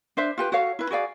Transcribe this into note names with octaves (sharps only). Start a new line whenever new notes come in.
D4 C5 E5
F4 G4 B4
F#4 A4 C#5 F5
E4 B4
F#4 G#4 D5 F5